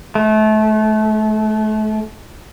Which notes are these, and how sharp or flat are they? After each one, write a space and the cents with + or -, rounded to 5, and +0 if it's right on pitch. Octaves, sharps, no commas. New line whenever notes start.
A3 -30